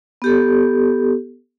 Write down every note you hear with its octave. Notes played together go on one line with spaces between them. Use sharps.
B3 G4 A4